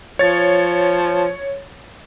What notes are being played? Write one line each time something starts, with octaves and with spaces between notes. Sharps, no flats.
F3 C#5 A6